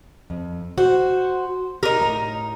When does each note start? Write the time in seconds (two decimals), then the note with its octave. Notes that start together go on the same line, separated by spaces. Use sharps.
0.30 F2
0.78 F#4 C5
1.83 D#4 G4 A#4
2.00 A2 A#5